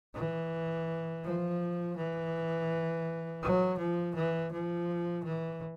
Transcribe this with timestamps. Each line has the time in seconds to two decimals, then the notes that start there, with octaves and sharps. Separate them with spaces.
0.15 E3
1.24 F3
1.96 E3
3.42 F#3
3.78 F3
4.15 E3
4.52 F3
5.24 E3